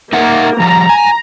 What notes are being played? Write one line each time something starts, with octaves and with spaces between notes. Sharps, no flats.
A#3 D#4 E5 F#5
F3 G3 A#5
G#5